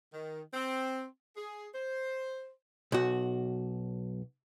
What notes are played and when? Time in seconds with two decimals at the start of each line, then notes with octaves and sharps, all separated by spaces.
0.14 D#3
0.54 C4
1.37 G#4
1.74 C5
2.92 B1 F#4